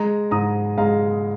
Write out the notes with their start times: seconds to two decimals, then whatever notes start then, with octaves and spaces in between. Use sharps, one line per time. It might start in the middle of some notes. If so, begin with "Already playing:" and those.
Already playing: G#3 A#5
0.31 G#2 A#5 D#6
0.78 G#3 F5 A#5